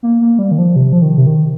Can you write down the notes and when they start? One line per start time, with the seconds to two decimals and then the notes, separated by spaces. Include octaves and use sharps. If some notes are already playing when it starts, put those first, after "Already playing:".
0.03 A#3
0.21 A#3
0.39 G3
0.51 D#3
0.58 F3
0.76 C3
0.93 F3
1.02 D#3
1.18 C3
1.27 D#3